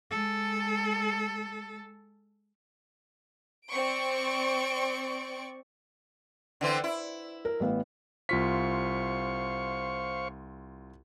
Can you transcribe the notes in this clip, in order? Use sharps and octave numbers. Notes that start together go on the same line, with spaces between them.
G#3 A4
C4 D5 C#6 D7
D3 E3 C4
E4
A#4
A1 B3 F5
C2 F4 C5 F5 C#6 B6